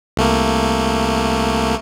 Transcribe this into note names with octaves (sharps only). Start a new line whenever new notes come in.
C2 A3 A#3